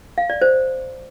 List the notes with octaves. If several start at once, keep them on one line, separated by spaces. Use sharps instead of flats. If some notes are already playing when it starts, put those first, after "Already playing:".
F5
D5
C5